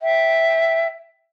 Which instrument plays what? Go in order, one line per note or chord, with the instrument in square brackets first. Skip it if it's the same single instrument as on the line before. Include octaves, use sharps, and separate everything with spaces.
[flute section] E5 G5